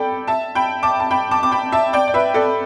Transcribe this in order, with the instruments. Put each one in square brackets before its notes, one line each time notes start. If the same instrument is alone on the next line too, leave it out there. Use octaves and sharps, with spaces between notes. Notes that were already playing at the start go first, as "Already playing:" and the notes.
Already playing: [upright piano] A4 D5 G5 B5
E5 A5
G5 B5
A5 D6
A5
G5 B5
A5 D6
D6
G5 B5
E5 A5
D5 G5
D5
B4 E5
A4 D5